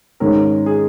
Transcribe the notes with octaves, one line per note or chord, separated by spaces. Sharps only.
G#2 D#3 G#3 C#4 A#4
G#4